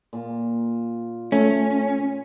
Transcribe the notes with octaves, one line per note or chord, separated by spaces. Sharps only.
A#2
A3 C#4